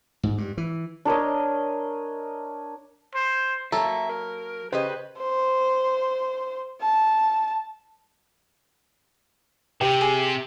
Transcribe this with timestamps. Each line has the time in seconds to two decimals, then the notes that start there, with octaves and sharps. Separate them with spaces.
0.23 G#2
0.38 G2
0.57 E3
1.05 D4 A#4 C#5 D#5
3.15 C5
3.72 F#3 A#3 A4 E5 A#5
4.09 A#4
4.72 C#3 G4 B4 C5 D#5
5.18 C5
6.82 A5
9.81 C3 G4
10.01 G#4